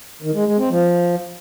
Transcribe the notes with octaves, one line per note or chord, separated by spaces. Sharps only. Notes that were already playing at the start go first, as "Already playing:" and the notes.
D#3
G#3
G#3
C4
F3